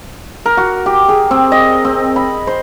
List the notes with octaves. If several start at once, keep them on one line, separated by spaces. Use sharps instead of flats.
A#4
F#4
G4
G#4
C4
D#5
C4
B5
C5